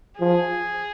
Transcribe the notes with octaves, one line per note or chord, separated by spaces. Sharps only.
F3 G#4